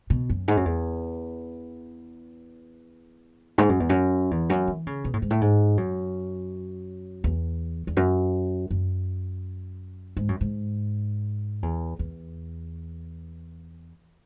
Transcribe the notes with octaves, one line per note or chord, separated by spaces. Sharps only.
B2
F#2
G#2
F#2
E2
G#2
F#2
E2
F#2
E2
F#2
E3
C#3
B2
A2
G#2
A2
G#2
F#2
E2
E2
F#2
F#2
G#2
F#2
G#2
E2
E2